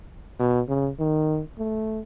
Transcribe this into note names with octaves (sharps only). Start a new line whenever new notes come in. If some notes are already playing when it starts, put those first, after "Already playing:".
B2
C#3
D#3
A3